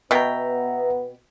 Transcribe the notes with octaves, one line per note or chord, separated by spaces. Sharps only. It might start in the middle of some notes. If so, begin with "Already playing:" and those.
B2 B3 E5 G5 A#5